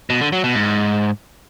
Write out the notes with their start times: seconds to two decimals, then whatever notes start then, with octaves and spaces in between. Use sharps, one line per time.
0.10 B2
0.21 D3
0.32 F#3
0.44 B2
0.55 G#2